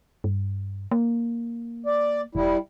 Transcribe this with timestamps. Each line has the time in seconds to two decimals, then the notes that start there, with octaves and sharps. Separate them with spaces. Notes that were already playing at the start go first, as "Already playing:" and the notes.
0.24 G2
0.91 A#3
1.86 D5
2.35 E1 G3 E4